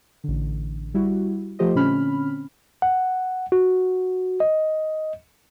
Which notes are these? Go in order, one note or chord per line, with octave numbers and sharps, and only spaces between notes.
A1 D3
G3 E4 F#4
F3 A3 F4 G4 C5 D#5
A#2 D3 C4 C#4 B5 F6
F#5
F#4
D#5